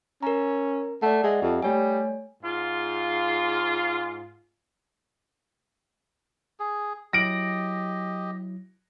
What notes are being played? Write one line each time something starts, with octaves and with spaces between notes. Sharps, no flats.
C#4 A#4 A#5
A3 D5 F#5
G#3 D#5 E5 F#5
F2 G4
G3 A3 C#5 G#5
G#2 F4
G#4
F#3 E4 G4 D#5 A#6 D7 F#7